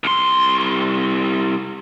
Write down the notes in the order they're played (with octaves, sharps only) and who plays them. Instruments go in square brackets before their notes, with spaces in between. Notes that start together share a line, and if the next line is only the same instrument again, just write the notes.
[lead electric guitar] C2 C6